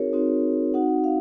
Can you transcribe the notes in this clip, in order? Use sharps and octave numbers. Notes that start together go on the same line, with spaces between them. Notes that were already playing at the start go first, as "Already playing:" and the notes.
Already playing: C4 D#4 F#4 G#4 A#4 C#5
C4 D#4 F#4
C4 D#4 F#4 F#5
F5